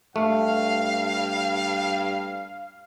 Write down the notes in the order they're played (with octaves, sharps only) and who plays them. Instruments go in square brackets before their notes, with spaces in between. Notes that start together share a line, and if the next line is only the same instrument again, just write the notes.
[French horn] G2 [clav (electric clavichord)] A3 [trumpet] F5